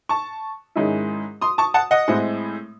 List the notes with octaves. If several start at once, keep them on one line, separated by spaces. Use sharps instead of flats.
A5 C#6
G#2 D#3 G#3 C#4 E4
C6 D#6
A5 C#6
F#5 A5
D#5 F#5
A2 G#3 C4 E4